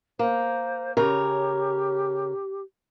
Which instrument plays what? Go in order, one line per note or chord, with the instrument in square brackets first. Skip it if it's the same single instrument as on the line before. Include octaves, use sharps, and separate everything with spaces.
[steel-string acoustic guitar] A#3 [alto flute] C5
[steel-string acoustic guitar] C#3 A#4 C#5 [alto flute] G4